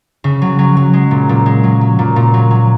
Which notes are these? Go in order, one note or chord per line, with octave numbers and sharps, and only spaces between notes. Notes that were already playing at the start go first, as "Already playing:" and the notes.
C#3
F#3
F#3
F#3
G#3
A#2
A#2
G#3
F#3
F#3
A#2
A#2
F#3
F#3